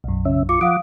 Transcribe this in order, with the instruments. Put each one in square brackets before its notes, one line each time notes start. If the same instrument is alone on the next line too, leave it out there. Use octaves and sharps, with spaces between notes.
[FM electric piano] B1 F#2
[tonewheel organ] C#3 C#4 E5
[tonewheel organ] F4 C#6 [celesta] D6
[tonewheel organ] F3 F#5 D6 [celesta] F5 D#6